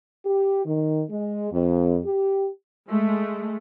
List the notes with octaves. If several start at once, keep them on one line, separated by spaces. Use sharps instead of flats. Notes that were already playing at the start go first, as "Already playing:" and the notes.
G4
D#3
G#3
F2
G4
G#3 A3